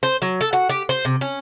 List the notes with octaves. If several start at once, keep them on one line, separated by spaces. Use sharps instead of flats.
C5
F#3
A4
F#4
G4
C5
C3
C#4